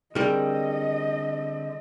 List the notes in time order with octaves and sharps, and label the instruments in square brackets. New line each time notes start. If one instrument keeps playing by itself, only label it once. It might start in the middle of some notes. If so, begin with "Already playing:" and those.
[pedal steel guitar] D3 C4 [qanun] G3 A#4 [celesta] G#4 [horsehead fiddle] D#5